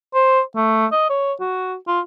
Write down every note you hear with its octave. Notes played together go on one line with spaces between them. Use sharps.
C5
A3
D#5
C#5
F#4
F4